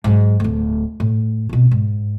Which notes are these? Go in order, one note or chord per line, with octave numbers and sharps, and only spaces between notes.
G#2 F#3
D1 D2
A2
B2 C4
G#2